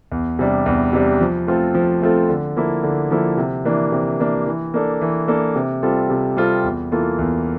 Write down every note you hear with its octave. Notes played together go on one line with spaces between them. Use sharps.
E2
C3 G3 D4
E2
C3 G3 D4
F3
A3 C4 F4 A4
F3
A3 C4 F4 A4
D3
F3 A#3 E4 A4
D3
F3 A#3 E4 A4
C3
E3 A#3 D4
C3
E3 A#3 D4
E3
A#3 D4 A4
E3
A#3 D4 A4
C3
G3 C4 F4 A4
C3
G3 C4 F4 A4
E2
E3 A#3 F4 A4
E2